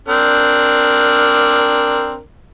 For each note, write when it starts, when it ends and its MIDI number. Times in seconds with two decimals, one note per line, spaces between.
0.08 2.20 60
0.08 2.20 62
0.08 2.20 70